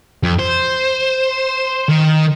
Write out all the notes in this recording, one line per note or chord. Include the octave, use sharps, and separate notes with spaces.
F2
C5
D#3